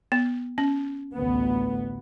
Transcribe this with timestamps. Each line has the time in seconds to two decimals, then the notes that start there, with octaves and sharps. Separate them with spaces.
0.12 B3
0.58 C#4
1.15 A1 D2 B3